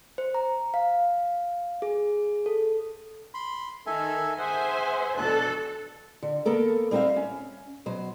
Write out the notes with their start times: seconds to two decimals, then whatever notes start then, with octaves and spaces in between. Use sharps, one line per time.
0.18 C5
0.34 A#5
0.74 F5
1.82 G#4
2.46 A4
3.34 B5 C6
3.87 D#3 A4 E5 G#5
4.39 G#4 C5 E5 F#5 G#5
5.17 B2 D4 A4 F#6
6.23 D3
6.45 A#3 B3 A4 A#4
6.91 G3 C4 D#4 C5 E5 F5
7.16 C#4
7.86 B2 F#3 C5